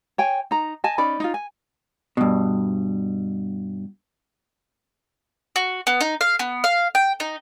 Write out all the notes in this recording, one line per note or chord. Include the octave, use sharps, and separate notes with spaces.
C#5 G5 G#5
D#4 A#5
D#5 G#5 A5
C#4 D#4 D5 B5
D#4 F4
G#5
G2 B2
F#4
B3
D#4
F5
B3
F5
G5
D#4